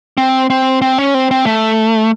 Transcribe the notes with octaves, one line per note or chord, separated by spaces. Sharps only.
C4
C4
C4
C#4
C4
C4
A3